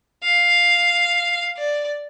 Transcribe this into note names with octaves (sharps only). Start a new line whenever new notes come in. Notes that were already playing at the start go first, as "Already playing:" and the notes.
F5
D5